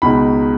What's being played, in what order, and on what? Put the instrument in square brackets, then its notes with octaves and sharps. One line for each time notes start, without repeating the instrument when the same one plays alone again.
[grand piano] C#2 B2 G#3 D#4 B5